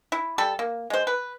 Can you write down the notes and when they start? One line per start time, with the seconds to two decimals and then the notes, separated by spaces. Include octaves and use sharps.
0.12 E4
0.38 G3 A4
0.59 A#3
0.90 G#3 C5
1.07 B4